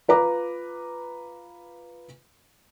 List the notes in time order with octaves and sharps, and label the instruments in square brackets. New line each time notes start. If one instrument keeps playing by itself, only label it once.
[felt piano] F4 B4 A#5 D6